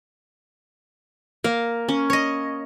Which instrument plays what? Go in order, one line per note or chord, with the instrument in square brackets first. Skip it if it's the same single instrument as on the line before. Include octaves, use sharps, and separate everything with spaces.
[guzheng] A#3 [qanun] F5
[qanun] C#4
[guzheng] C#5 D#5